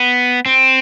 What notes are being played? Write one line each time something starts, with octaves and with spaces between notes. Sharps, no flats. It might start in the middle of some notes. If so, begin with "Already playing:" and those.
Already playing: B3
C4